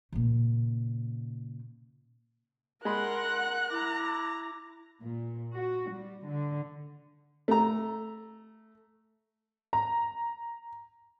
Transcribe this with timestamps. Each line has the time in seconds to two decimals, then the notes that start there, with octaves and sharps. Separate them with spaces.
0.12 A#2 C#3
2.85 G#3 A#4 F#5 B5 C6 F#6
3.71 E4 A#5 D6
5.03 A#2
5.54 F#4
5.91 G3
6.28 D3
7.48 A3 A#5
9.73 A#5